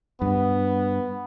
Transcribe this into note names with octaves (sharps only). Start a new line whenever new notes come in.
G2 B3